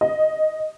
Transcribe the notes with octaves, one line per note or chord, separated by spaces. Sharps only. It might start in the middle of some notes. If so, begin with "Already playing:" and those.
D#5